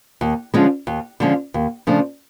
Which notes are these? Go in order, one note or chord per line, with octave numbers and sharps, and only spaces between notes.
D#2
D3 F3 G#3 C#4
D#2
D3 F3 G#3 C#4
D#2
C#3 F3 A3 D4